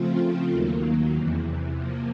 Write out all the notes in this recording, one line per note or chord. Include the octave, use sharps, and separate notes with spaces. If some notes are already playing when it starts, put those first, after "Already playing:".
Already playing: C#3 F3 A3 C4 F4
D#2 D#3 F#3 A#3
E2 C3 E3
C3 F3 A#3